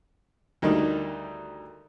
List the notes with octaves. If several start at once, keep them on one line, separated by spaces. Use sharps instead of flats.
D2 D#3 G3 D#4